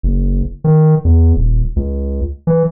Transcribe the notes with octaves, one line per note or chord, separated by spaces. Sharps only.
F#1
D#3
E2
D#1
C#2
E3